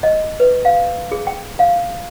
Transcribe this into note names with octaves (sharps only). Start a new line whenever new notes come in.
D#5
B4
F5
G#4
G5
F5